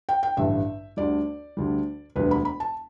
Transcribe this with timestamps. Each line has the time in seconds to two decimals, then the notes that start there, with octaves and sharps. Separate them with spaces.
0.09 G5
0.23 G5
0.37 A1 G2 D3 E5
0.97 D2 D3 G3 D5
1.57 D2 D3 G3
2.16 E1 D2 D3 G3 B4
2.31 B5
2.45 B5
2.60 A5